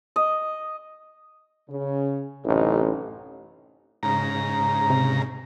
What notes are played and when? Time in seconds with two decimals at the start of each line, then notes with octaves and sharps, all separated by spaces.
0.16 D#5
1.69 C#3
2.45 A1 F#2 C3 D#4
4.03 G#2 C#3 A#5
4.90 C3